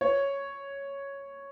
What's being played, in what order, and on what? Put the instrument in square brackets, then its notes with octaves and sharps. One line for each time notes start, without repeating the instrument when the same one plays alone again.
[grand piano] C#5